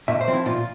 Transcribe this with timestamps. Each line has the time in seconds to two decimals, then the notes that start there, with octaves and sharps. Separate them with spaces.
0.08 A#2 E5
0.21 C5
0.28 F3 C4
0.33 E4
0.46 A#2 F4